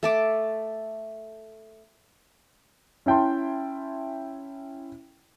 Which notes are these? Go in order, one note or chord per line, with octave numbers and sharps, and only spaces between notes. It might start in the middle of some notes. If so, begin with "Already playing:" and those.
A3 A5 D6
C#4 E4 G5 A5 C6